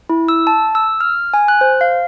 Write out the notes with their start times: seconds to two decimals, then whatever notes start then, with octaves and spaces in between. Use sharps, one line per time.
0.10 E4
0.29 E6
0.47 A5
0.75 E6
1.00 F6
1.34 G#5
1.48 F#6
1.61 C5
1.81 F5